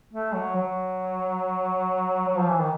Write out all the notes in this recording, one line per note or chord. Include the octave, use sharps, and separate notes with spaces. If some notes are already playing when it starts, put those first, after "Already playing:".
A3
F#3
F#3
F#3
F3
E3
D#3